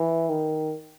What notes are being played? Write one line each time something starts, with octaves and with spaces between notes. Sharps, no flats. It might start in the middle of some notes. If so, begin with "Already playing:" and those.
Already playing: E3
D#3